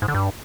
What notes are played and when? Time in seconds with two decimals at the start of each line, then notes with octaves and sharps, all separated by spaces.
0.02 G#2
0.08 D3
0.14 G2